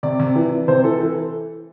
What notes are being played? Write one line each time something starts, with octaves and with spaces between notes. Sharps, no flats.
C3 D5
C3
E3
E3
C3 C5
E3 A4
E3 A4